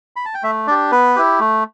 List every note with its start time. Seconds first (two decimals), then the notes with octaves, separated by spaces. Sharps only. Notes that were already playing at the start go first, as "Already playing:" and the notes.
0.16 B5
0.25 A5
0.34 G5
0.43 A3 E5
0.67 D4 G4 D5
0.92 B3 B4
1.16 E4 G4
1.40 A3